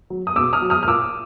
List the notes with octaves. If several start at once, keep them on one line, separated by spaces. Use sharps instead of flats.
F#3
D#6
B2 D6 E6
D#6 F6
F#3
D#6 F6
F6
A#2 D6 E6